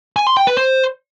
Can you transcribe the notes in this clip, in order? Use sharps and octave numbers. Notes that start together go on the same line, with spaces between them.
G#5
C6
G5
B4
C5